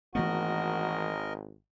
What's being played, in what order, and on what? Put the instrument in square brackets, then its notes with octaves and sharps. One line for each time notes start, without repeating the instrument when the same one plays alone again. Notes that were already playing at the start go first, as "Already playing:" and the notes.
[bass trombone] G#1 [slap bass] E3 A3 B3 [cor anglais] F#4 [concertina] A#4 D#5